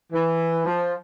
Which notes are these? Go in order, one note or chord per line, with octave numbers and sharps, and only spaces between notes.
E3
F3